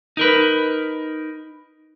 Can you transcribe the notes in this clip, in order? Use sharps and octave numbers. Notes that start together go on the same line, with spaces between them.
D#4 A#4 B4